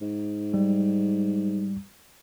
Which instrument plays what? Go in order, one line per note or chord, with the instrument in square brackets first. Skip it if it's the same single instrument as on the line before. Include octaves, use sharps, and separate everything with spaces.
[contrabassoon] G#2
[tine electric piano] G3